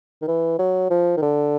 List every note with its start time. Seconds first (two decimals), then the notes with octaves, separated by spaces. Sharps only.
0.22 D#3
0.28 E3
0.59 F#3
0.90 F3
1.17 D#3
1.22 D3